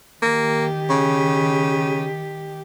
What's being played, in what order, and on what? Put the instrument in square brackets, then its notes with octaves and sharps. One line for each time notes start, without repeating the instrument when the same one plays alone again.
[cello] D#3 G4 [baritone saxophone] A#3
[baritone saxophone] C#3